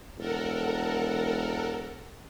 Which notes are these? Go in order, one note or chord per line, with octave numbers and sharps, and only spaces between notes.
E1 A4 A#4 F#5